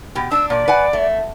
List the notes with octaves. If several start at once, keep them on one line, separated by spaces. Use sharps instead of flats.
B2 G4
D4 E6
A#2 D5
B4 F#5 G#5
A3